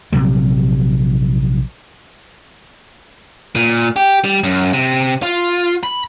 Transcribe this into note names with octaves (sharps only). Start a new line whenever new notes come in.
A#1 C3 F#3 G3
A#2
G4
G3
F#2
C3
F4
B5